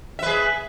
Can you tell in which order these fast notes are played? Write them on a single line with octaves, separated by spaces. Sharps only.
E5 B4 G#4